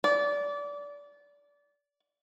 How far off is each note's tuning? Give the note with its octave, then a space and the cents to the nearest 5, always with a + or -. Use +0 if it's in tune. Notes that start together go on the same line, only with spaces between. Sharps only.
D5 -25